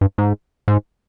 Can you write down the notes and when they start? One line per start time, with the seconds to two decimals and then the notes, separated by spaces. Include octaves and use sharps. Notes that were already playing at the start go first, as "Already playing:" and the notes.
0.01 G2
0.18 G#2
0.68 G#2